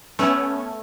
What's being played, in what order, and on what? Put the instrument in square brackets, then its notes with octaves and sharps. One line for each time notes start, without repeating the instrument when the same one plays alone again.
[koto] A3 [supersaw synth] B3 C#4